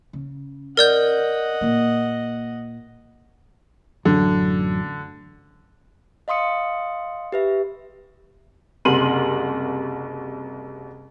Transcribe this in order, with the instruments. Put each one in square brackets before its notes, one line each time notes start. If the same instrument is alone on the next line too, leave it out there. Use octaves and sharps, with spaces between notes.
[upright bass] C#3
[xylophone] A#4 D5 G6 [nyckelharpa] D#5 F#5
[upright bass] A#2 A#3
[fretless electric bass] A1 F#2 F#3 [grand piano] D3
[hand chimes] D#5 F5 C6 D#6 C#7
G4 B4 E5
[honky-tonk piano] F#1 C2 A#4 C6 D#7 F#7